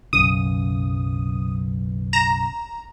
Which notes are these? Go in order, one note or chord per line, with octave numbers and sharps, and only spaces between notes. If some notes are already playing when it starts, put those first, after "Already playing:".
B1 F#2 C#3 D#6
A#5 E7